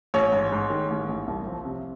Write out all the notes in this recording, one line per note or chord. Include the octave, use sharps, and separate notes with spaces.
A1 C#5
G#2
G#2
D#3
A1
A1
C2
F3
C3